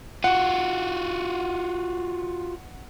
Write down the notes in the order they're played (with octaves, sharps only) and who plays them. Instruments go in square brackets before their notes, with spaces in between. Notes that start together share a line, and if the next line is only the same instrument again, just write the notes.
[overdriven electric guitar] F4 F#4 [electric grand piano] F#5